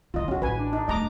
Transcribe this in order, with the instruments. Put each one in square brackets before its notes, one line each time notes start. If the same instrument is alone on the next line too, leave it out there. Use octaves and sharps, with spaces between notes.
[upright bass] D3 E4 [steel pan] F4 D#5
[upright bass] C#2 [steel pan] C#4 F#4
[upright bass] A1 [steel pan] B4 G#5
[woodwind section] D4
[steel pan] D#4
[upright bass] D1 A3 [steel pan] D#5 A#5 D6